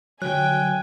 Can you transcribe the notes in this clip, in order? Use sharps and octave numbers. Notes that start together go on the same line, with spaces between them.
D3 F#3 G5 G#5 F#6